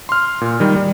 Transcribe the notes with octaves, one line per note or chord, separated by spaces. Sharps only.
C6 F6
A#2
D#3 G3
G3